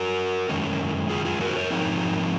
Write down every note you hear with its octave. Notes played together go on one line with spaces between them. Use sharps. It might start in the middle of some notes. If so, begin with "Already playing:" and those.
Already playing: F#4 A#4
F#2 D#3 G#3 C#4
F4 G#4
F4 G#4
F#4 A#4
C5
A#4 C#5
G#2 F3 C4 D#4 A#4 C#5